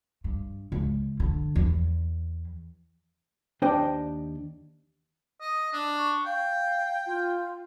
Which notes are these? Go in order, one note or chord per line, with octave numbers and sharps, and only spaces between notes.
G2
C#2
D3
E2
D#2 D4 C5 D5 D#5 G5
D#5
D4
C#6
F5 G5
F4